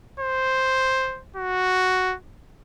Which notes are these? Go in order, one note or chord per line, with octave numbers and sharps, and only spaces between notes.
C5
F#4